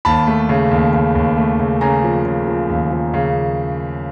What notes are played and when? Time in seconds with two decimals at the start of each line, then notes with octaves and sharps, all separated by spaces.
0.05 D#2 A5 B5
0.27 A3
0.49 C#3
0.71 D#2
0.93 C#3
1.15 D#2
1.37 A3
1.60 C#3
1.81 C#3 G#5 A#5
2.04 F3
2.25 C#3
2.48 F3
2.69 D#2
2.92 F3
3.14 C#3